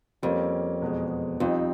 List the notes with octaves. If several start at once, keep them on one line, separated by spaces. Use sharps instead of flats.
F2 G3 A#3 C#4
E2 B2 G#3
F2 G3 C4 D#4